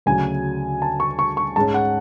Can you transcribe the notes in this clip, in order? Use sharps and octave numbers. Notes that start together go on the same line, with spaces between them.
D2 C#3 F#3 G#5
A5
C#6
C#6
C#6
G#2 G#3 C#4 A5
F#5